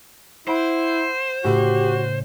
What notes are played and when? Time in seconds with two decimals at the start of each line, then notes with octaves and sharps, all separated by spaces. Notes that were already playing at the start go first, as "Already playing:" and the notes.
0.48 E4 C5 F#5 B5 D7
1.44 A2 C#3 F#4 G4